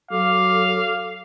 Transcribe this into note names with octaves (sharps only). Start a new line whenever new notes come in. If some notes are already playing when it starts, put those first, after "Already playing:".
F#3 A4 F5 D6